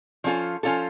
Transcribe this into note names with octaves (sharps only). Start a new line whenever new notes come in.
F3 C#4 F4 A4
F3 C#4 F4 A4